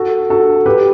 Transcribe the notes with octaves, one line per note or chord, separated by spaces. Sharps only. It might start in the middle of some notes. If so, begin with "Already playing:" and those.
Already playing: F#4 A4
F#4 A4
G4 B4